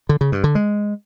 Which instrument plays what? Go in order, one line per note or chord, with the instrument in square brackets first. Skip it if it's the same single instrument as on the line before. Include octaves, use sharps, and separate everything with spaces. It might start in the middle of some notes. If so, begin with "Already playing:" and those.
[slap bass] D3
C#3
G2
D3
G#3